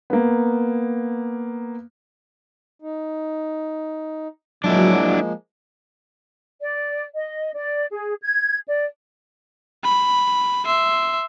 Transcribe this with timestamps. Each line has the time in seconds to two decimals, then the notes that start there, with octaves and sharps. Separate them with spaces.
0.10 A#3 B3
2.82 D#4
4.64 F3 F#3 G#3 A#3 D4 E4
6.61 D5
7.14 D#5
7.54 D5
7.91 G#4
8.22 G#6
8.67 D5
9.84 B5
10.65 E5 C6